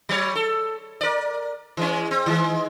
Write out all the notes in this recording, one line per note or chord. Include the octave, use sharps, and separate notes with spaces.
F#3 C#5
A4
A#4 D5
E3 G#3 C#4
C4
D#3 E3 G#3